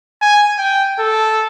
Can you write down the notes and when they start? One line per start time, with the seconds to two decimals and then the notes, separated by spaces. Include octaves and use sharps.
0.21 G#5
0.58 G5
0.99 A4